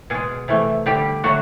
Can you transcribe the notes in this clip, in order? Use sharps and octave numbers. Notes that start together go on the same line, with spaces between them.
B2 G#3 G#4
C3 E3 A3
D3 G3 G4
D3 F#3 A3 F#4